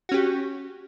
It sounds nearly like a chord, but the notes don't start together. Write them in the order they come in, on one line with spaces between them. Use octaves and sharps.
F#4 C#4 G4